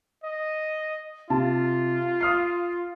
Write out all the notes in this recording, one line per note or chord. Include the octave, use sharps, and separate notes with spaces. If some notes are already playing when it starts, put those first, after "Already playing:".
D#5
C3 F4 A5
D#6 F6 C7